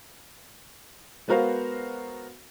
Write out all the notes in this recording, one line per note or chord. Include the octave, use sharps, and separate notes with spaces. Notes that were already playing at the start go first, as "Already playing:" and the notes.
G#3 B3 F#4 A#4 C5 F5